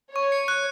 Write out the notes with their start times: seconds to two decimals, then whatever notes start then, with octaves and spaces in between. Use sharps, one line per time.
0.15 C#5 C#6
0.32 C#7
0.48 F#6